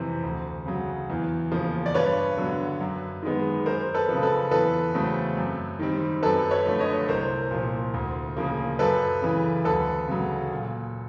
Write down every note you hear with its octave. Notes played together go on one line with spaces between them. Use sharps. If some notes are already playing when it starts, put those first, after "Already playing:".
Already playing: F2 C3 E3 C5
D2
C#3 F#3
E2
C#3 F3 A#3
D5
G2 B4 C#5
D3 F#3 B3
F#2
D#3 G#3 B3
F#2 A#4 C5
A4 B4
C#3 F3
A4 B4
E2 A4 B4
C#3 F#3 A3 C4
F#2
D#3 G3 C4
F#2 A4 B4
B4 C#5
D3 F3 A3
C#5 D#5
C2 A#4 C5
A#2 F3
D2
C#3 F3 A#3
F#2 A4 B4
C#3 E3
D2 A4 B4
C#3 F#3
A#2